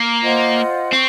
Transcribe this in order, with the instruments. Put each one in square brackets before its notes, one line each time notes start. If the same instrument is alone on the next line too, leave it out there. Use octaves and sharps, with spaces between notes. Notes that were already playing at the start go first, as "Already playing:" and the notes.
Already playing: [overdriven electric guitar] A#3
[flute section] F4 C5 D#5 F#5
[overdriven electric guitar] C4 [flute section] C#6